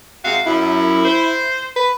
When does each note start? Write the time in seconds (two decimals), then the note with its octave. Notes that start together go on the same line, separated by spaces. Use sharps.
0.24 C3 G#3 F#4 F5
0.46 F#2 E4
1.05 C5
1.76 B4